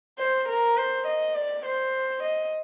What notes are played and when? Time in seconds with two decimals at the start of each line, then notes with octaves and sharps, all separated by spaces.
0.19 C5
0.49 A#4
0.77 C5
1.07 D#5
1.35 D5
1.65 C5
2.23 D#5